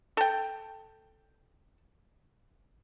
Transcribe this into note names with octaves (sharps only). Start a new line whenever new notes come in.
A4 G5